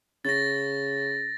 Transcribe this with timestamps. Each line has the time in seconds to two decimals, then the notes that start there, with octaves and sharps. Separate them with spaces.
0.25 C#3 A6 A#6